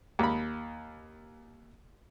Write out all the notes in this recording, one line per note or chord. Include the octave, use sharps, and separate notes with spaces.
D#2 B5